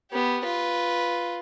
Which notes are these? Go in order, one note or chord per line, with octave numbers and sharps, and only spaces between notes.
B3 G4
F4 B4